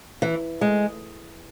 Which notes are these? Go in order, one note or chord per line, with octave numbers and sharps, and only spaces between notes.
E3
G#3